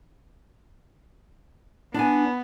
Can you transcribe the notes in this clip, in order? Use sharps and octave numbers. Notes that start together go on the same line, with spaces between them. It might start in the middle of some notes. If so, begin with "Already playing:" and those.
B3 D4 G#5